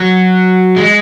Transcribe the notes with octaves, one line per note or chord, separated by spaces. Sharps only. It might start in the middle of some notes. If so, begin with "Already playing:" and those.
Already playing: F#3
G#3